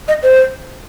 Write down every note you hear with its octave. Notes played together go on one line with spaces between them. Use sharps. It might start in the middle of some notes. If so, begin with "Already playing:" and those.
D#5
C5